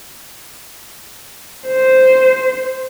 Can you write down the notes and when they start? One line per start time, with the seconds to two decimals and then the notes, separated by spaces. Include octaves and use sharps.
1.67 C5